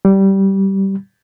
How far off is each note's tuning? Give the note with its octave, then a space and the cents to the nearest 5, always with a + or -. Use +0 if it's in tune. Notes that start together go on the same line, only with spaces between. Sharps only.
G3 -15